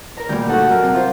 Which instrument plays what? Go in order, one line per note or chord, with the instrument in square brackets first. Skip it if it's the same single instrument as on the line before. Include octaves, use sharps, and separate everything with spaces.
[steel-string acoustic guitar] A#4 A#5
[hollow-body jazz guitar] D2 A#2 [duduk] G3 [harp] G6
[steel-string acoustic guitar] D4 F#5 [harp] D#4 F#4 [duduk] A4
[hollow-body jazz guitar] F#2 [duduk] A#4
[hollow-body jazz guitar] C3 [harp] G3
[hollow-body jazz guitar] F4 [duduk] C5